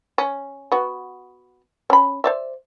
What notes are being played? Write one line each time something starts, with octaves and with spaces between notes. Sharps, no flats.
C#4
B3 F#4
C#4 B5
C5 D5 E5